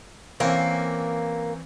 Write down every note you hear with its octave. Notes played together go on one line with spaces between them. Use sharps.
E3 A#3 C4 C#4